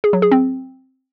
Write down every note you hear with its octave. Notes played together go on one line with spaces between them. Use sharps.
G#4
F#3
G#4
C4